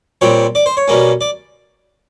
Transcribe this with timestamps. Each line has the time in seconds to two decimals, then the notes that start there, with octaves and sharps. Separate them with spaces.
0.21 A#2 G3 C4 C#5
0.55 D5
0.66 C5
0.77 C#5
0.88 B2 G3 A#3 C#4
1.21 D5